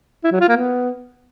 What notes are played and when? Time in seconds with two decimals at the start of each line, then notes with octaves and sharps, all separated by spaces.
0.24 E4
0.32 F#3
0.41 F4
0.49 A#3
0.57 B3